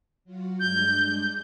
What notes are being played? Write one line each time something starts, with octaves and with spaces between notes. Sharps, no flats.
F#3 F4 F#4
G2 G#3 D4 G6